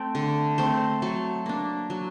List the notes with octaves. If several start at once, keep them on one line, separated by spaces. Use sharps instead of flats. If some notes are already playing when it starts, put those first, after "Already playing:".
Already playing: A3 C4 G5
D3
A3 C4 C5
F#3 A4
A#3 D4
F#3